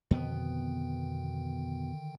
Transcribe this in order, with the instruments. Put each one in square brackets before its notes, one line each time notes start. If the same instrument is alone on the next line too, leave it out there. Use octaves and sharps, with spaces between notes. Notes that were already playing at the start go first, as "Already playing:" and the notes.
[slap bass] F2 B2 B3 [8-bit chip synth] D3 D#3 G5